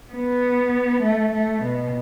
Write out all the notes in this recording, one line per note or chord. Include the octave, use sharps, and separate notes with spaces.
B3
A3
A3
B2